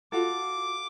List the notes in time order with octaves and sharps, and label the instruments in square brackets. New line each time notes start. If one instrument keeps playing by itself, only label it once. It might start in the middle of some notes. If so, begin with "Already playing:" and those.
[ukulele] F4 F#4 A4 [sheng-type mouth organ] D6